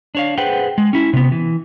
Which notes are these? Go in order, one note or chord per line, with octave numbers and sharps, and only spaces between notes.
D4 C#5 F5
G#4 B4 C5 F#5 G5
G#3
C#4 E4
C3 B3
E3